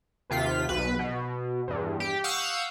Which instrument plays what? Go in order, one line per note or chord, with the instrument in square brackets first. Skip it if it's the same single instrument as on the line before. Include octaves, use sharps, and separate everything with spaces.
[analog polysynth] D#2 C3 F4 B6
B1 B4
B2
E2 G2
G4
F5 F#5 C#6 D#6 E6 G6